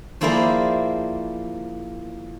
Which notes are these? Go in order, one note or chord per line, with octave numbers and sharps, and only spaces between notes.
F3 A#3 E4 G#4 C5 D5